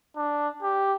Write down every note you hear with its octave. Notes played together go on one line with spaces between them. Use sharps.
D4
G4